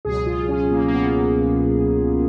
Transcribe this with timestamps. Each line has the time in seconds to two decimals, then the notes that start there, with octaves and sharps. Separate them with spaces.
0.05 C#2 B2 F#3 G#4
0.26 F4
0.49 C#4
0.71 A#3
0.88 A#3
0.93 B3